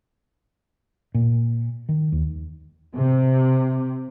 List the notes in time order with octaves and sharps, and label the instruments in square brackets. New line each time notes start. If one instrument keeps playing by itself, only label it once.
[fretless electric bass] A#2
D#3
D#2
[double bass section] C3